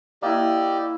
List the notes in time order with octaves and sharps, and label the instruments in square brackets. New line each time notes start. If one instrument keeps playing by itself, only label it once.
[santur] A#3 E4 [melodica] G4 D5 D#5